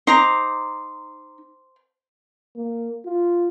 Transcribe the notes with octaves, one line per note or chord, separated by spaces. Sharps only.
D#4 C5 A#5 D6
A#3
F4